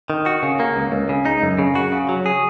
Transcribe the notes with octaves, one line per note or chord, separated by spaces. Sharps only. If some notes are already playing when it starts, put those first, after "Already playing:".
D#3
F#4
C#3
A#3
C#2
C#2
C#3
D#4
F#2
C#3
F#4
C#3
F#3
G#4